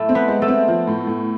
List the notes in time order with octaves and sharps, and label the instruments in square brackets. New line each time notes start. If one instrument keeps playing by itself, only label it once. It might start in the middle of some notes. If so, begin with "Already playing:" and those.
Already playing: [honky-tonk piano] A2 [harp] A3 A4
[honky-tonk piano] C4
[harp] B3 B4
[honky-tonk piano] G#3
[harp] A3 A4
[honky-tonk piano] C4
F3
A2
A2